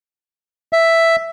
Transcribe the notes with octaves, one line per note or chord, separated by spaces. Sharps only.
E5